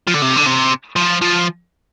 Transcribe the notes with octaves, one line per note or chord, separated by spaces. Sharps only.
F3
D3
C3
D3
C3
F3
F3